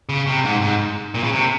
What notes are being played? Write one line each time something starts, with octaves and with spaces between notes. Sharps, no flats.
C#3
C3
G#2
G#2
A#2
C#3
C3